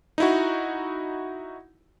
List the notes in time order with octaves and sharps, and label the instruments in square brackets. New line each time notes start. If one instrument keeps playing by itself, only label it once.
[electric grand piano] D#4 E4 F#4